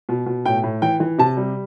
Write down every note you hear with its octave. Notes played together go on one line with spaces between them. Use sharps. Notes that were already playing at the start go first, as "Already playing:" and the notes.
B2
B2
A2 G5
A2
E3 G5
E3
C3 A5
G3